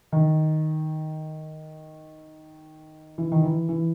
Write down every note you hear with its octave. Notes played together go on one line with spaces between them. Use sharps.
D#3
E3
D#3
E3
E3